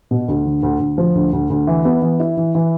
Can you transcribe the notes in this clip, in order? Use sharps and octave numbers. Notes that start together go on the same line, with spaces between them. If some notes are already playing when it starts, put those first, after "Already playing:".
B2
D2
D3
D2
D2
F3
D2
D2
D2
E3
B3
E3
E4
E3
E3